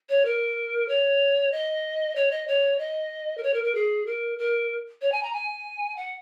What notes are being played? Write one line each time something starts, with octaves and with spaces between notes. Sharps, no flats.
C#5
A#4
C#5
D#5
C#5
D#5
C#5
D#5
A#4
C#5
A#4
A#4
G#4
A#4
A#4
C#5
G#5
A#5
G#5
F#5